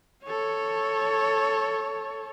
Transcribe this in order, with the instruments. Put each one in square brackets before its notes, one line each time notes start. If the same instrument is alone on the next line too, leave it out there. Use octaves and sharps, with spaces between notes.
[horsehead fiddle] A4 C#5